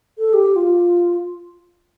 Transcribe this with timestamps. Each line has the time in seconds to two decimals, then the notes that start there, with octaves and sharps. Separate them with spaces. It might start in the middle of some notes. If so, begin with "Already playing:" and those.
0.18 A4
0.33 G4
0.56 F4